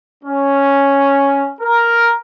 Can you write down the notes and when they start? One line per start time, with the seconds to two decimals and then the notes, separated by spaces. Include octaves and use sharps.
0.24 C#4
1.60 A#4